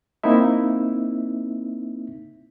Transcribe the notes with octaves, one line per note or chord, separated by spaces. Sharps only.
A#3 C4 D#4 E4 E5